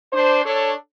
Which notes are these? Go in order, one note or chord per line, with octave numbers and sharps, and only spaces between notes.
D4 C5
D4 A4 C#5